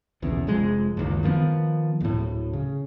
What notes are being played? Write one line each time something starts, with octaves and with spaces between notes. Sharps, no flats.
B1 E2 C#3
F1 F2 G#3
F#1 C#2 D#3
D#3 F3 G#3 B3
D1 A2
C#3